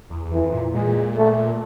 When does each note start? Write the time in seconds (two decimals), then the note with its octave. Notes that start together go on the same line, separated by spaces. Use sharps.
0.10 E2
0.25 E2
0.32 F2 E3
0.43 F2
0.52 A#2
0.74 A#2 G#3
1.16 A3